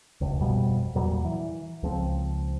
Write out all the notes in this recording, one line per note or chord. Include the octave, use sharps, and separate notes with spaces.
F1 C#2
G1 F2 B2 G3
E2 A#2 F#3 G3
E3
C#2 F3 C4